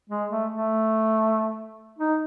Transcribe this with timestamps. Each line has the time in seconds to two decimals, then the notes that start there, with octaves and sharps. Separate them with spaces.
0.10 G#3
0.31 A3
0.52 A3
1.99 D#4